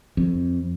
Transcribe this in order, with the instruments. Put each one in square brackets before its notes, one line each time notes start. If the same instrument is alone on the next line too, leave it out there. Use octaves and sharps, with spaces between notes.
[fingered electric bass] F2